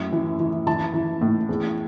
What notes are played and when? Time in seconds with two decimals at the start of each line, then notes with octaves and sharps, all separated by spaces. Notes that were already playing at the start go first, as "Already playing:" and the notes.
Already playing: F#2 A2
0.13 E3
0.40 E3
0.67 E3 A5
0.94 E3
1.21 A2
1.49 E2